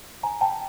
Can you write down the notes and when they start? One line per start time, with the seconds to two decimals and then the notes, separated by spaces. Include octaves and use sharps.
0.23 G#5 A#5
0.41 G5 A5